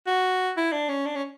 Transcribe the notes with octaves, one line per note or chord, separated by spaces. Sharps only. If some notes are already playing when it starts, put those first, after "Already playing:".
F#4
E4
D4
C#4
D4
C#4